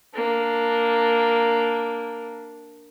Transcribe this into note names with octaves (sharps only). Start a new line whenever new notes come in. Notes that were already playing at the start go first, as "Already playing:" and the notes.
A#3 D4